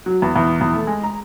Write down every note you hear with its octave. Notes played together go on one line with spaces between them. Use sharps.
F#3
E2
E2
E2
A3
G#3
A#5